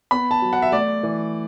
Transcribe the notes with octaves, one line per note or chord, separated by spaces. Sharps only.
B3 B5
A5
F#3
F#5
E5
A3 D5
E3